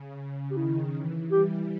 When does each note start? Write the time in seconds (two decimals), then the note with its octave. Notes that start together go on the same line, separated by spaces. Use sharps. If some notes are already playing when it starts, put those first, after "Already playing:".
Already playing: C#3
0.51 G4
0.57 D#3 E4
0.94 E3
1.31 G3 G4